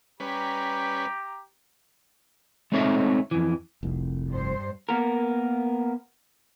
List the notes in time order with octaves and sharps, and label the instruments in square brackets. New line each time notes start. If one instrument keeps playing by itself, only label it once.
[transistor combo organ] G3 C#4 B4 [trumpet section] G4 A#5
[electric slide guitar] G#3 A3 C4 D#4 C#5 E5
F2 E3
[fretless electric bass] F1 C2
[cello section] G2 C5
[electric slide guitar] A#3 B3 A#4